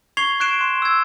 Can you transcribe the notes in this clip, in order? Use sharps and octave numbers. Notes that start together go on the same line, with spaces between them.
C#6 G#6 C7 F7 G7
C#6 F#6 G#6 C7 D7 E7
C6
E6 G#6